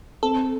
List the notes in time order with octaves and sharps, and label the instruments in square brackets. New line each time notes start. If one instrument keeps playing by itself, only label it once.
[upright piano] C4 [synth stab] A4